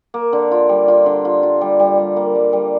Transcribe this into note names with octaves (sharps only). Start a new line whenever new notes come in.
A#3
D3
F4
G3
F4
D3
F4
F4
G3
G3
G3
A#3
G3
G3